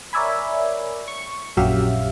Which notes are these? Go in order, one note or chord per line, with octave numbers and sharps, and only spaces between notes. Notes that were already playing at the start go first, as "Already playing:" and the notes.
A#4 C#5 D5 E5 G#5 B5
C#6
A#1 F#2 F#3 G4 E5 F5